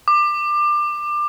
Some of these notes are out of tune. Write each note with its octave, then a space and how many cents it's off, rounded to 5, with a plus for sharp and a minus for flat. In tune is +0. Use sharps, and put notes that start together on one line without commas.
D6 +25